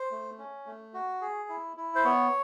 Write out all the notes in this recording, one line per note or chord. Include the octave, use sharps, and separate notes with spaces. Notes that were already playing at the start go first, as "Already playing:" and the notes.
Already playing: C5
A3
C#4
A3
F#4
G#4
E4
E4
C5
B3 C#5